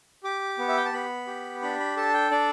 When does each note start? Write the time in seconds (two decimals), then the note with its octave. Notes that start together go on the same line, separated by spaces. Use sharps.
0.24 G4 D6
0.58 B3
0.68 E5
0.77 G5
0.85 A5
0.93 B3 B5
1.27 G4
1.62 D4 B5
1.80 B5
1.97 A4 A5
2.14 G5
2.31 D4 D5